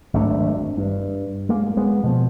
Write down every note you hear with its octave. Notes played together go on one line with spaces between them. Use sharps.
G#1 F#2 A3 D4
G2
G#3 A#3
G#3 B3
B2 F3